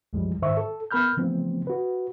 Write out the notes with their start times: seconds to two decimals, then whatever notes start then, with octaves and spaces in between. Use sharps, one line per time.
0.13 C2 F#2 E3 F3 G3 G#3
0.42 G#2 D#3 C5 E5 C#6
0.57 A4
0.91 B3 A#4 B5 F6 G6
1.17 C#3 E3 F3 A3 B3 C4
1.67 F#4 B4